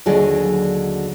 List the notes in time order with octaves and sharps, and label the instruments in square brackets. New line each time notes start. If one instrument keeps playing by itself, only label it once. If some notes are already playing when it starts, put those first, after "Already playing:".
[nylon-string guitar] D#2 D3 F#3 G#4 D5 D#5